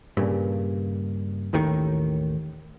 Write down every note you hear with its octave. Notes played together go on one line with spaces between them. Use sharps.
G2 A#2 C#3
A1 D#2 A2 D#3